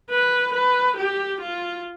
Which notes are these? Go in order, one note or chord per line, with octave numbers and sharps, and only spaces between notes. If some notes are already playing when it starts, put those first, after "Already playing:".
B4
B4
G4
F4